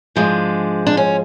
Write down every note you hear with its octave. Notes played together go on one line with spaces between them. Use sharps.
G#2 F3 G#3 D4
D4
C#4